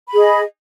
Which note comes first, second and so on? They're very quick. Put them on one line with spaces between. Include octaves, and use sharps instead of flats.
B5 G#4 D#5